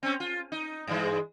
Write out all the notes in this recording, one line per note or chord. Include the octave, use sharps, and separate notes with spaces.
C4 C#4
F4
D#4
G2 E3 G#3